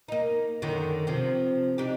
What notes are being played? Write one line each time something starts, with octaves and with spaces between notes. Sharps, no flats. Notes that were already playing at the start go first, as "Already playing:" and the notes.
A#3 D#4
F#2 D3 D#3
C3 F3
D4 D#4 G4